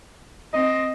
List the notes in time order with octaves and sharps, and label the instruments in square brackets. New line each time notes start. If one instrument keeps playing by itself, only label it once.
[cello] C4 [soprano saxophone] D#5